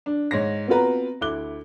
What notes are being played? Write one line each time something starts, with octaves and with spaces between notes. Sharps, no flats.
D4
G#2 C#5 A#6
B3 C4 F4 F#4 B4 A#5
D2 E4 D6 F#6 G7